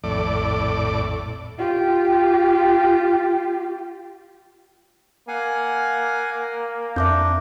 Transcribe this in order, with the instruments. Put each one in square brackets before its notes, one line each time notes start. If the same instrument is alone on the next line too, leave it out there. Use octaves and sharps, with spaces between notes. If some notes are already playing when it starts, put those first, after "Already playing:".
[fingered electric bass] D#1 A#1 F2 [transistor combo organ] A2 D5
[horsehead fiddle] F4 G4
[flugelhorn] A#3 [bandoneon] F5 F#5 G#5
[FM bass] F2 [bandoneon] D4 [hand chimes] E5 D6 G6